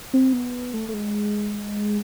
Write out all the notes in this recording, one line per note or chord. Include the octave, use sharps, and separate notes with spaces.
C4
B3
A3
A3
G#3